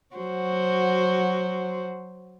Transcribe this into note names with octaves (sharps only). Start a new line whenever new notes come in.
F#3 F#4 C5